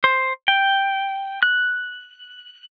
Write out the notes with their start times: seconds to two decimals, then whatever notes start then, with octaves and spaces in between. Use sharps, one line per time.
0.04 C5
0.48 G5
1.43 F#6